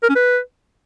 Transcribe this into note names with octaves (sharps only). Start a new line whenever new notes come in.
A#4
C#4
B4